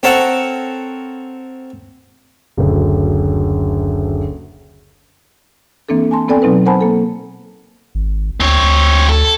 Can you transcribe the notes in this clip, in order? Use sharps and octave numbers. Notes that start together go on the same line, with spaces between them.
C4 A4 A#4 C#5 F#5 A5
F#1 D2
E3 A#3 C4 D4 A4
G#5 A5 C6
B3 C4 A4 D5 G5 G#5
B2 F#3 C4 D#4 B4
A#4 C5 F#5 G#5 A5 B5
A#3 A4
G#1
D2 C4 C#5
D2
A4